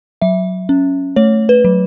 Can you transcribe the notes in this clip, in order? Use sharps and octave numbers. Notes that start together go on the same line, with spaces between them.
F#3 E5
C#4
A3 C#5
B4
F#3